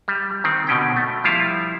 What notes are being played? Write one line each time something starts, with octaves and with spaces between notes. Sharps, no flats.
G3
D#3 C4
B2 D3 C#4 G5
A3
F3 G3 E4 F4 F5